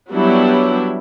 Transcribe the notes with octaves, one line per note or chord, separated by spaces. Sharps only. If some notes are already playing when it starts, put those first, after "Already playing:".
F#3 G3 B3 D4 E4